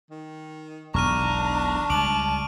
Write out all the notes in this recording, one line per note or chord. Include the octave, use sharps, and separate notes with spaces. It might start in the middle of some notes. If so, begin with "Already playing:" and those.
D#3
E1 B1 E2 D4 A#5 C#6 F6 D#7
C#2 G3 A5 D6 D7 F#7